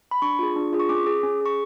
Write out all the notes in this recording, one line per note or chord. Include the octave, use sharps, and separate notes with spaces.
B5
D4 C#6
F4 G#4
D4
F4 G#4
C#6
C#4 D6
G#4
C#4
G#4 C#6